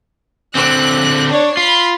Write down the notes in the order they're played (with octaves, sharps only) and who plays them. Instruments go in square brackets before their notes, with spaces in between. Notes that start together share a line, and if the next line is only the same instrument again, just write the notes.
[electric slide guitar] D3 C4 [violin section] F#6
[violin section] D4 C#5
[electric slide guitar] F4 [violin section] B5 C7